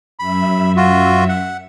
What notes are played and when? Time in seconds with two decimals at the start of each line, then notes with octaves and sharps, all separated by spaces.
0.19 F#2 E5 B5
0.77 F4 F#4
1.29 F#5